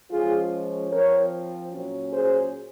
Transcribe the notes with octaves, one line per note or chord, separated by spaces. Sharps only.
F3 G#3 C#4 F4 G#4
F3 C4 A#4 C#5
A#2 F#3 C#4
G#4 C5